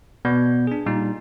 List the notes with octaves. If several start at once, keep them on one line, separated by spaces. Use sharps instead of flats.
B2 B3 D5 G6
D4 G#4
A#2 G3 D#4